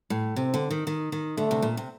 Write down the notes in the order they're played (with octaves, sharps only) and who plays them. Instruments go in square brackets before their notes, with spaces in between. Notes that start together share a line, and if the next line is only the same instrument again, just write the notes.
[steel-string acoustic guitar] A2
[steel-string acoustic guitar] C3 [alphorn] C4
[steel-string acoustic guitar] D3
D#3
D#3
D#3
[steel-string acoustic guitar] D3 [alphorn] A3
[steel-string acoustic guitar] C3
A#2
C3